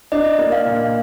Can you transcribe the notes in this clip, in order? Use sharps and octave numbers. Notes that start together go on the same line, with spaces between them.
D4 D#5
A#3
F5
A#2